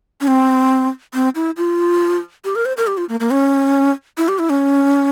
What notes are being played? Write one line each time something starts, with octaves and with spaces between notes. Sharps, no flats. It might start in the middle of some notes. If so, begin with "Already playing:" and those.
C#4
C4
C4
E4
F4
G4
A#4
C5
A#4
G4
F4
A#3
A#3
C#4
E4
G4
E4
C#4